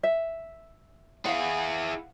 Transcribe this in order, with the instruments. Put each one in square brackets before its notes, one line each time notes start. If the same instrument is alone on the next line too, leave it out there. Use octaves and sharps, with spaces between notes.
[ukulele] E5
[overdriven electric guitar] E4 G#4 [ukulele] F5 F#5